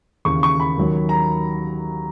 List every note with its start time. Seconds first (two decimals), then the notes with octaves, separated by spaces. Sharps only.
0.25 D#2 C#3 E3 C#6
0.43 C#6
0.60 B5
0.77 D#2 D#3 F#3
1.09 A#5